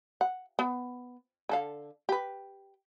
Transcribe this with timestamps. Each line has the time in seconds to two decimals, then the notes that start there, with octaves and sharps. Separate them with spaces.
0.21 F#5
0.59 B3
1.49 D3 A4 F5
2.09 G4 B4